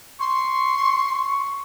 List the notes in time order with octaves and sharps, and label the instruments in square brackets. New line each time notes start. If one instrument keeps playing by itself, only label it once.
[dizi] C6 [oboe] C#6